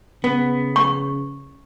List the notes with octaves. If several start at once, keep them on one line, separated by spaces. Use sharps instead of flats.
C#3 B3
C#6